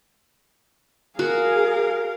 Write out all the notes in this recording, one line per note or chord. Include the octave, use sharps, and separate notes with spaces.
F#4 G#4 A#4 F5